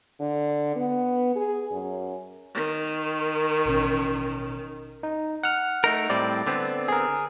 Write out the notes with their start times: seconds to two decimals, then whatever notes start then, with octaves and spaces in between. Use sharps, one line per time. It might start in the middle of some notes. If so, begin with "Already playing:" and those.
0.20 D3
0.76 B3
1.36 G#4
1.72 F#2
2.54 D#3
3.65 A1 B2 C#4
5.03 D#4
5.43 F#5 F6
5.84 A3 D#4 A#4
6.10 A2 G3 C4 D5
6.47 D3 B3 C4
6.88 G#4 A#4